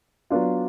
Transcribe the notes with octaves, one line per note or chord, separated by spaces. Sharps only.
F#3 B3 D4 F4